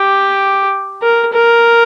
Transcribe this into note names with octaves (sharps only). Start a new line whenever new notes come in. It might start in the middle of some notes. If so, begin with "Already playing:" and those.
Already playing: G4
A#4
A#4